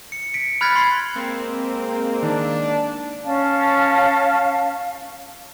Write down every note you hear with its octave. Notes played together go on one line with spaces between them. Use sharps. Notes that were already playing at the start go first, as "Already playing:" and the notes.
C#7
B6 C#7 D7
B5 F6 F#6 G#6 A6 B6
B5 C6 G#6 C7
G#3 A#3 C4
D#3 D4 D#4
C#4 F5 A5